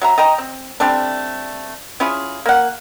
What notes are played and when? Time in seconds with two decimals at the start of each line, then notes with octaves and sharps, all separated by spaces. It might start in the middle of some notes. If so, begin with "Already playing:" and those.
0.01 F#3 E5 A#5
0.18 D#5 G5 A#5
0.38 C4
0.80 G3 A3 C4 D4
2.00 C#4 E4 F4 G#4
2.46 A#3 F#5